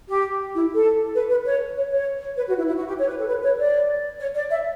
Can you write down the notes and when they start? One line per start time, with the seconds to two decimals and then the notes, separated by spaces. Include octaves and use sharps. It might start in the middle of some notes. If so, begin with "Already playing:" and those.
0.09 G4
0.54 E4
0.75 A4
1.15 B4
1.30 B4
1.45 C#5
1.77 C#5
1.91 C#5
2.37 B4
2.48 F#4
2.57 E4
2.67 E4
2.77 F#4
2.87 G4
2.98 C#5
3.08 B4
3.18 A4
3.28 B4
3.43 C#5
3.59 D5
4.19 C#5
4.35 D5
4.51 E5